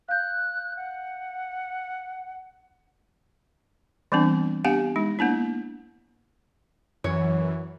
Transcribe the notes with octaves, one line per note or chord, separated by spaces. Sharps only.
F5 F#6 G6
F#5
E3 G3 B3 C4 D4
B3 D4 G4 F5 F#5 G#5
G#3 D#4
A#3 B3 D4 E4
F#2 E3 C#5